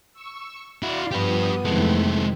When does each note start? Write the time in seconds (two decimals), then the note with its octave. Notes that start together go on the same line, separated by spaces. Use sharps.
0.13 C#6 E6
0.83 E4 F#4 D5 F5 C6
1.11 G2 F3 B3 G4 B4 D#6
1.65 F2 C3 D#3 G#3 A3 E4 A4